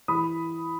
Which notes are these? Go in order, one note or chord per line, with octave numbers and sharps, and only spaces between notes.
E3 B5 D#6